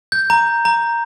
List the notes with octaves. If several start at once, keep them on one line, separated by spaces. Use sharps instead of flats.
G6
A#5
A#5